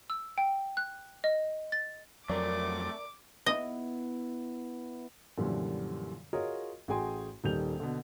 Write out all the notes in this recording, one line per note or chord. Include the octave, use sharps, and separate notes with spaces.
E6
G5
F#6
D#5
A6
F2 F#3 A3 C4 A#4 D5 D6
B3 E4 D#5
F#2 A#2 D3 E3 F3 G3
F4 F#4 G#4 A#4 C#5 D#5
A1 F#4 G#4 G5 G#5 C6
D#1 D#3 G3 G6 F7
B2 D3